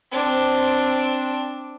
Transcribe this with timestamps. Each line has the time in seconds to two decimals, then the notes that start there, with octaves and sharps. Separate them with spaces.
0.12 C4 D4